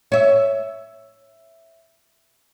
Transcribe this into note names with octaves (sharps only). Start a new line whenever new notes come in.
C#5 E5